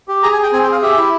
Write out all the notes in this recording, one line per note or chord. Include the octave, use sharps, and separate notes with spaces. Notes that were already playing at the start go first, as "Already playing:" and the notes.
G4
G#4 A#5
G#5
G#4
G5
C4 G#5
G5
G#4
F5
G4 E5
E4